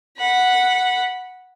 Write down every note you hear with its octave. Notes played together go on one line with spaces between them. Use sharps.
F#5 B5